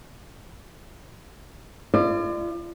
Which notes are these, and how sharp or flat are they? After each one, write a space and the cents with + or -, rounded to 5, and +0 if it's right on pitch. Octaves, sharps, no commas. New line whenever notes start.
F4 -40 D5 +35